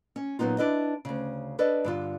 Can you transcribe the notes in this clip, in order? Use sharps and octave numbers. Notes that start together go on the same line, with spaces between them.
C#4
A#2 F#3 A#3 B3 D#4 F4
D4 E4 B4 D#5
D2 C#3
D4 A4 B4 D5 D#5
G2 D3 F4